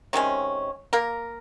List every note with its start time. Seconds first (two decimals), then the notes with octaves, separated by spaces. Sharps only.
0.13 C3 D#3 G#3 C#4
0.93 A#3 A#4